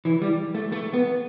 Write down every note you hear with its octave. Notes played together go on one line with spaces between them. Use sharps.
E3
G3
A3
A3
B3